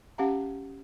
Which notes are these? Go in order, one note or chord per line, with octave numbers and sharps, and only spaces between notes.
C#4 G4 F5 F#5 A#5